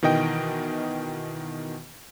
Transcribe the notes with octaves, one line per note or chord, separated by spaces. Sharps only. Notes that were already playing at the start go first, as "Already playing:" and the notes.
B2 D#3 E3 D#5 G5 D7